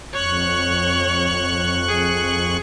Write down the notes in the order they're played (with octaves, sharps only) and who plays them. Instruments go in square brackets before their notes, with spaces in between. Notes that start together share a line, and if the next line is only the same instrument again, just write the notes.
[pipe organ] F2 C#6 F#6 [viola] C#5
[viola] G#4